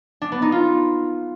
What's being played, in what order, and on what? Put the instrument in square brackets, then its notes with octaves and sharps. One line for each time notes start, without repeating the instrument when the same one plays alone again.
[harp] D4
B3
D#4
F4